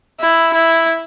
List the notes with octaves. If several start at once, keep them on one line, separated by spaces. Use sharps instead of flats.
E4
E4